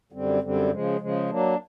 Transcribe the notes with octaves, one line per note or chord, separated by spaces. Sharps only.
F#2 D3 G3 C4
F#2 D3 G3 C4
C#3 F3 G#3
C#3 F3 G#3
F#3 A#3 D4